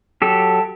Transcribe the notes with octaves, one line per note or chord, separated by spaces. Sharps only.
F#3 G4 A4